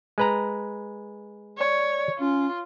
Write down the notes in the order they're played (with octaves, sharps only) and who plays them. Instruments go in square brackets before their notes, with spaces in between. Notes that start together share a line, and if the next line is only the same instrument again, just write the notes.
[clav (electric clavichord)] G#3 B4 A#5
[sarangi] C#5 [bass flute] D5
[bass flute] C#4 [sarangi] F4